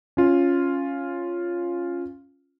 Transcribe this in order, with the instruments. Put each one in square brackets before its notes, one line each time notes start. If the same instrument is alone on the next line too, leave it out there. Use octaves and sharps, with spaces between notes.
[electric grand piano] C#4 F4